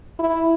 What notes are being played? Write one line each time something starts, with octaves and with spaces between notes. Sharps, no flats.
E4